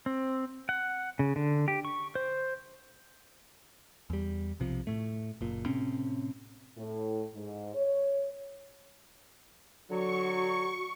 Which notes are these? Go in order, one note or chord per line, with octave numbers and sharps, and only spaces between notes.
C4
F#5
C#3
D3
G4
C#6
C5
E2 G3
B1 C3 F3
A2 A3
F#1 A#2
A2 C3 C4 C#4
A2
G#2
C#5
D3 F#3 F#4 C#6